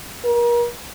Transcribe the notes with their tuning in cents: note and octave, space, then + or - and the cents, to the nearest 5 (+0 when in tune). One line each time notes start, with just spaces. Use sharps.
A#4 +35